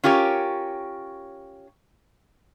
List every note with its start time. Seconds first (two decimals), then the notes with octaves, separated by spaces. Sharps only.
0.04 C#4 F4 G4 A#4 C#5